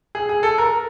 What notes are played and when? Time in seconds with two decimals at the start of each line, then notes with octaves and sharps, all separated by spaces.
0.15 G#4
0.29 G#4
0.43 A4
0.58 A#4